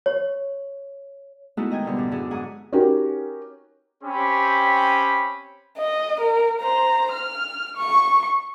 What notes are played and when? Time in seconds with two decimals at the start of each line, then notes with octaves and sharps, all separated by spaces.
0.06 C#5
1.57 G#3 A3 B3 D#4 E4 F#4
1.71 D#3 D#5 G5 G#5
1.85 B2 D3 G3 B3
1.96 F#2 A2
2.11 D3 D4 E4 F#4 G#4
2.31 G#2 F#5 G#5 D#6
2.73 C#4 D#4 F#4 G4 A#4 B4
4.04 C4 C#4 G4 B5
5.78 D#5
6.21 A#4
6.60 C5 A#5
7.12 F6
7.77 C#6